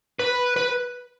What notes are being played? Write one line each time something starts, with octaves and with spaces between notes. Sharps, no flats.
B4
B4